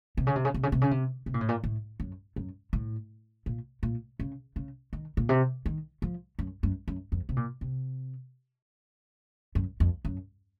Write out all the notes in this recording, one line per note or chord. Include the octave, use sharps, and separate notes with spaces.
C3
C#3
C3
C#3
C3
C#3
C3
C#3
C3
C3
A#2
A2
A#2
A2
F#2
F#2
A2
A#2
A#2
C#3
C#3
D#3
A#2
C3
D#3
F3
F#2
F#2
F#2
F2
C3
A#2
C3
F#2
F2
F#2